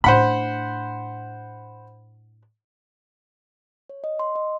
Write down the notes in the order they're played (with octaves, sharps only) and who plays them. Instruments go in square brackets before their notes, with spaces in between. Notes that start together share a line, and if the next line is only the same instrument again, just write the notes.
[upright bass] A2 D4 [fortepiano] C5 F#5 B5
[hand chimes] C#5
D#5
C6
D#5